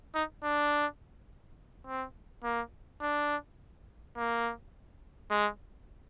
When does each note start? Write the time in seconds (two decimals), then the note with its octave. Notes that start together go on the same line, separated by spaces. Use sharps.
0.15 D#4
0.43 D4
1.87 C4
2.44 A#3
3.02 D4
4.17 A#3
5.30 G#3